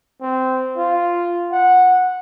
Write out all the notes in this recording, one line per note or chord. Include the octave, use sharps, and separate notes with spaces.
C4
F4
F#5